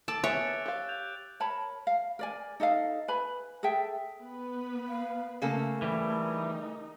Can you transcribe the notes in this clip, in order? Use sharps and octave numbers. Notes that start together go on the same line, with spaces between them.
A4 A5 D6 E6 D7
B3 G#4 C#5 E5 F#6 A6 D7
G4 F5
G6 F7
A#4 C#5 A5 B5
F5
A#4 D5 G#5
D#4 A4 D#5 F5
B4 G#5 B5
G#4 A4 E5 G5
B3 B4
F5
C#3 A3 A#3 A4
E3 G3
D#4